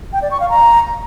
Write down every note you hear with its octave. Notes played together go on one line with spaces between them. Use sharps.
G5
D5
C#6
F5
A#5